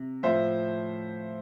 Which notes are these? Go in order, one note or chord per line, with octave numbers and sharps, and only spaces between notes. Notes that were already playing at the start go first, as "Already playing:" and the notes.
Already playing: C3
A2 F3 C5 E5